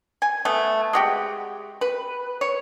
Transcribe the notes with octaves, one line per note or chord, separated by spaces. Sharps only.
G#5
A3 B3
G#3 F#4 G4
B4
C#5